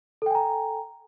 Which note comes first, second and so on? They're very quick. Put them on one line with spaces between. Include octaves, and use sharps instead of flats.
A4 G5 G#5 A#5